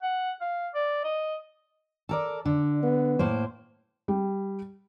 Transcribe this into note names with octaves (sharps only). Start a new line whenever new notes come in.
F#5
F5
D5
D#5
A4 A#4 D5
D3 D4
B3
A2 A#3 C5
G3